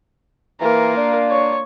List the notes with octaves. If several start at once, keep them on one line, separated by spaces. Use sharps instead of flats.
E3 A#3 F4 A#4
D4
C#5